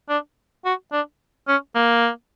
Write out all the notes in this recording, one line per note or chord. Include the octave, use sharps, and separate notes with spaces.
D4
F#4
D4
C#4
A#3